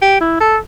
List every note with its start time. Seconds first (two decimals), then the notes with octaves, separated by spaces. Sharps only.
0.02 G4
0.21 E4
0.40 A4